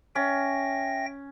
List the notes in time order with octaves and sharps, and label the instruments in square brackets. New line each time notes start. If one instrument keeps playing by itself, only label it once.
[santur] C#4 [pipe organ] E5 G5 A#6